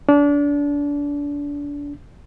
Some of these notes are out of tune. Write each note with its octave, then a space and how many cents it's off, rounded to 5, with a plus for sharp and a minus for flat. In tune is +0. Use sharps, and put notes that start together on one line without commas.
D4 -30